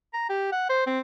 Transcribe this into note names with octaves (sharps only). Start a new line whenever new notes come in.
A#5
G4
F#5
C5
C4